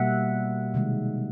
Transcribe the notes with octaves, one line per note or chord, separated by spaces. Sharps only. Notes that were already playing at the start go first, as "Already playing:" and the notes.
Already playing: B2 G3 A#3 E5 F#5
C3 D#3 G#3